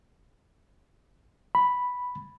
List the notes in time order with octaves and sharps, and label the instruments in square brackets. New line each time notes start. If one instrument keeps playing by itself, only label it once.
[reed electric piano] B5